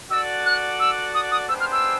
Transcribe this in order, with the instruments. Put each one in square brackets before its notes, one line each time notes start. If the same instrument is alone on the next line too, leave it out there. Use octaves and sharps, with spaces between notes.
[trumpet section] F#4 A4 D5 F#5 [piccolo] E6
[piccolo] F#6
E6
D#6
D#6
[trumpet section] G#3 B3 D4 G4 C5 [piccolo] E6
[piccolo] F6
E6